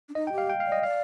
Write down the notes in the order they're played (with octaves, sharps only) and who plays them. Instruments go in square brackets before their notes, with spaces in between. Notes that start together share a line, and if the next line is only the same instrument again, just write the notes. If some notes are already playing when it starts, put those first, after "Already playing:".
[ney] D4
[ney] D#4 [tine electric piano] D#5
[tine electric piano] G5
[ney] G4
[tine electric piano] F5
G5
F5
[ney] D5
[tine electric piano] D#5
[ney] D5 [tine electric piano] F5